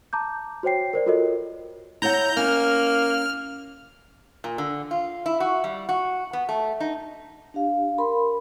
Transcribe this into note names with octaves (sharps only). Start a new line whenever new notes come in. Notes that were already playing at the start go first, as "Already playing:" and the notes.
A5 A#5 D6 G6
F#4 C5 C#5 G5 C7
A#4 C5 D5
F4 F#4 A4 A#4 C#5 D#5
E4 C#5 F#5 A#5 G6
A#3 C#4 F6
A#2
D3
F4
E4
F#4
G3
F#4
B3
A3
D#4
D4 G4 F5
A#4 B5 C6